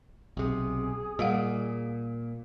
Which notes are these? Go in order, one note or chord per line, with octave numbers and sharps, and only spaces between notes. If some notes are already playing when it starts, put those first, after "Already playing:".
B1 C3 G#4
A#2 G3 F5 F#5